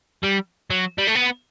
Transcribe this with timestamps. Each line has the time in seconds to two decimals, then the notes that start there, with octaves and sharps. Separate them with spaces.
0.24 G3
0.70 F#3
0.98 G3
1.07 A3
1.15 B3